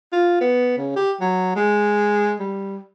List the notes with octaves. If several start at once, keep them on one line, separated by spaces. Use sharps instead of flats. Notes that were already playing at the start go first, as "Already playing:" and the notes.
F4
B3
C#3
G4
F#3
G#3
G3